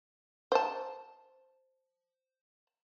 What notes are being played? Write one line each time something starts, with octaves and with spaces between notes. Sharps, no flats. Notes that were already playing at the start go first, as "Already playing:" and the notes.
C5 A5